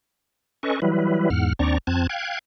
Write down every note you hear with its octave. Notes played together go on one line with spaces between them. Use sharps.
C#4 A4 B4 D#5 C#6
E3 F#3 G3 E4 B4
E2 G#2 F#5 F6
D#2 C4 D4 D5 A#5 C#6
F2 C4 A5 F#6 G#6
F5 G5 F#6 G#6